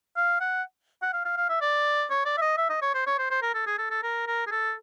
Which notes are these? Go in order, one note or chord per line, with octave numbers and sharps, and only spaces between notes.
F5
F#5
F#5
F5
F5
F5
E5
D5
C#5
D5
E5
D#5
E5
D#5
C#5
C5
C#5
C5
C5
A#4
A4
G#4
A4
A4
A#4
A#4
G#4
A4